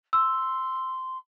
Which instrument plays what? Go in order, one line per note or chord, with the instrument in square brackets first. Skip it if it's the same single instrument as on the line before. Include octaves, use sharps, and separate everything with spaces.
[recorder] C6 [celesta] E6